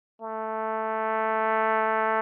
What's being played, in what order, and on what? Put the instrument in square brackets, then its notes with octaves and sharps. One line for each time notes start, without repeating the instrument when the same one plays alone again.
[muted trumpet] A3